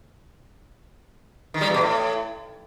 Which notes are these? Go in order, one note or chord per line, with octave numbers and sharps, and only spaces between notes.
D#3
G3
E2
B2
A2